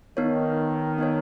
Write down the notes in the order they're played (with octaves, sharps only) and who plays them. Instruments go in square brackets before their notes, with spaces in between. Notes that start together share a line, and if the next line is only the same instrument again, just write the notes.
[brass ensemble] D#3 [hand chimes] B3 D#4 A#4 C#5
[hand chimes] B3 D#4 A#4 C#5